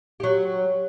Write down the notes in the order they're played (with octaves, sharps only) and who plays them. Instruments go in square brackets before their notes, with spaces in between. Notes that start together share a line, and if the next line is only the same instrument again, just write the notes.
[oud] F#3 G4